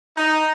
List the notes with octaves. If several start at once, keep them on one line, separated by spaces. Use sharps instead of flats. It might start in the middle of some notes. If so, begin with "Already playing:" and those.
D#4